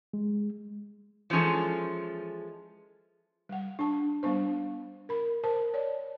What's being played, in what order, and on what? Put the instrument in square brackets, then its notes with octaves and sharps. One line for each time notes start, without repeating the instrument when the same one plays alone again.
[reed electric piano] G#3
[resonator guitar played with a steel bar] E3 F3 G#3 C#4 G#4 A4
[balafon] G3 F#5
D4 A5
G3 B3 D4 C5
A#4 B5
A#4 C5 A5
C#5 D5